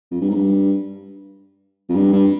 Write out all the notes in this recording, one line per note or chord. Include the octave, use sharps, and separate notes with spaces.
F2
G2
G#2
G2
F2
G2
G2